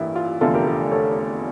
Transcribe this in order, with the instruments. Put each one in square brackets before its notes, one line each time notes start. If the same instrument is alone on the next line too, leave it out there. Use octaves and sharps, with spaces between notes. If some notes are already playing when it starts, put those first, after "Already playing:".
Already playing: [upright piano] A1 G2 E3 A#3 E4
F4
F1 E2 D3 A3 F4 A4
G4 A#4
G4 A#4
A4 C#5